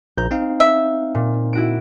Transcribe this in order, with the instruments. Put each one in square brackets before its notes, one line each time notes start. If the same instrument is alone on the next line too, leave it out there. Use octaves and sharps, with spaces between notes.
[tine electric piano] A#1 A#5 [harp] G6
[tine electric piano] C4 D#4 F5
[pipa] E5
[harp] A#2
E4 F#4 D7